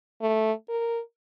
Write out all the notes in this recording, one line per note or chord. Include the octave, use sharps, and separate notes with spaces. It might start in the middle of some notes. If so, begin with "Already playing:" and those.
A3
A#4